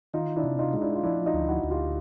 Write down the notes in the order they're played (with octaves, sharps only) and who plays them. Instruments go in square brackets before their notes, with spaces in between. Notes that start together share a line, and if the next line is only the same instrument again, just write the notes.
[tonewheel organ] D#3 [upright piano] D#4 F4
[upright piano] D4 E4
[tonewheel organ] C3
[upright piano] D#4 F4
[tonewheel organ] G#3 [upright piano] F4
[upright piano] D4 E4
F4
[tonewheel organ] F3 [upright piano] D4 E4
[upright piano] D#4 F4
[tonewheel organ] D2
[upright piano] E4 F#4
[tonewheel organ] D2
[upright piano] F4 G4